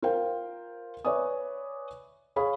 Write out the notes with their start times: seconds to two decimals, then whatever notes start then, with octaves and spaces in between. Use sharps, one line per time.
0.02 F4 A#4 C5 F5 G5
1.05 B4 C#5 D5 E5 G#5 D#6
2.36 G#4 C#5 F5 B5 D#6